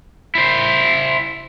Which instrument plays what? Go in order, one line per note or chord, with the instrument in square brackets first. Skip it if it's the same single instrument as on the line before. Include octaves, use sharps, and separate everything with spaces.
[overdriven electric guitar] E4 C5